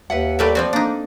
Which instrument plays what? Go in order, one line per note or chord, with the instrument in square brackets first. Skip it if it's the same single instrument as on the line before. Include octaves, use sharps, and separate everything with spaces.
[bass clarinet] D#2 [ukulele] B4 E5 F#5
[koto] G3 A3 E5 [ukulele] A#4 B4 D5
[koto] F3 C4 F#4 [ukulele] D5
[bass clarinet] A#3 [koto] D4 D#4